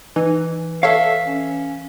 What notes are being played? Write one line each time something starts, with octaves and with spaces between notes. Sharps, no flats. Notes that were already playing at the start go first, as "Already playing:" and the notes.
E3 D#4
A4 C#5 E5 F5
C#4